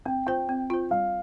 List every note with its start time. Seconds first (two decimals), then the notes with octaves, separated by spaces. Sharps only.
0.06 C4 G5
0.27 F4 C5 G5
0.49 C4
0.70 F4 C5
0.91 G3 F5